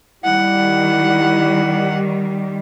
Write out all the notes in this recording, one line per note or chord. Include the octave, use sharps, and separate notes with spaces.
D#3 G3 E4 F#5